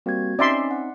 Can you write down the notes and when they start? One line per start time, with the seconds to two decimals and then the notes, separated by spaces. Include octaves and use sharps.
0.06 G3 A#3 C4 F#4 G#6
0.39 C4 C#4 D#4 D5 E5 C6
0.71 F#5